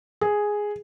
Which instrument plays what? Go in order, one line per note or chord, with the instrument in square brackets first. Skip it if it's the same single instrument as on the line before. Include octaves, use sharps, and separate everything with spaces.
[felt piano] G#4